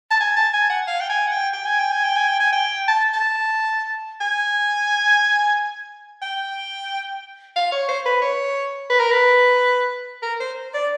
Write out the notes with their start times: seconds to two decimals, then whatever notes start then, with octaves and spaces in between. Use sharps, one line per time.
0.11 A5
0.20 G#5
0.36 A5
0.53 G#5
0.70 F#5
0.87 F5
1.00 G5
1.10 G#5
1.27 F#5
1.32 G5
1.53 G5
1.66 G#5
1.79 G5
1.91 G#5
2.04 G5
2.16 G#5
2.28 G5
2.40 G#5
2.53 G5
2.88 A5
3.14 A5
4.21 G#5
6.22 G5
7.56 F5
7.72 C#5
7.88 C5
8.06 B4
8.22 C#5
8.90 B4
9.00 A#4
9.11 B4
10.22 A#4
10.40 C5
10.74 D5